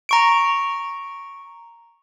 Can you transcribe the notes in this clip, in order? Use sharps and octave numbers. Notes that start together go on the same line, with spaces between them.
A#5 C#6 D7